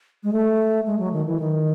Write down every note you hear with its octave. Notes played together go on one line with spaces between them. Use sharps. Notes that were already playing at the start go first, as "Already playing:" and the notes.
G#3
A3
G#3
F#3
D#3
E3
D#3